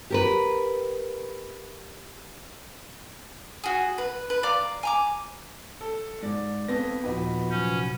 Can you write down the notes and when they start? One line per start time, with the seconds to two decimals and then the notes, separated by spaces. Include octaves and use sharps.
0.10 G4 A#4 B4
3.64 F#4 G#4
3.98 B4
4.30 B4
4.43 D5 F5 A#5 D6
4.83 G#5 A#5 D6
5.81 A4
6.23 G#2 D5
6.68 B3 C4 A4 A#6
7.03 D#2 A#2 F3 F#4 B4 D#5
7.50 C3 F#3 C#4 G6